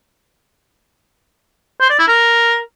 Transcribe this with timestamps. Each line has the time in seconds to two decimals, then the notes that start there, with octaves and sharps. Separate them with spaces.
1.81 C5
1.90 D5
1.99 E4
2.08 A#4